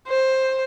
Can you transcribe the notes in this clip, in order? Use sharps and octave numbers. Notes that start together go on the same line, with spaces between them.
C5